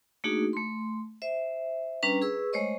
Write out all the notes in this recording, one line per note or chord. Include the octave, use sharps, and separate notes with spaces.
A3 A#3 D4 D#4 F#4 G#4
A3 C6
C5 E5
G3 C#4 D4 B4 A#5
G#4 B4 C#6 E6
G#3 A3 C5 C#5 D#5 C#6